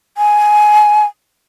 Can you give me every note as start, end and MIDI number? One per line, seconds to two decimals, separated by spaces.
0.17 1.05 80